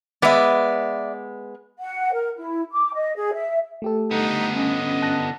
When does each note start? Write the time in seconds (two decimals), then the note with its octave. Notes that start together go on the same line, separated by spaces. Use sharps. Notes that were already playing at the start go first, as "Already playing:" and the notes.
0.22 G#3 B3 D5 E5
1.80 F#5
2.12 A#4
2.37 E4
2.71 D6
2.94 D#5
3.15 G#4
3.34 E5
3.82 A3 G4 A4
4.11 D3 B3 D#4
4.56 C#4 D#5
5.02 A5 F#6 A#6